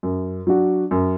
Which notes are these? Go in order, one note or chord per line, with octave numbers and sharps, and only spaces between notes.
F#2
F#3 D4 F#4
F#2